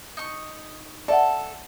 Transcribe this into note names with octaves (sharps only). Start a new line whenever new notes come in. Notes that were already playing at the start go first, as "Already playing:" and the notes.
D#4 C#6
A4 D5 E5 F#5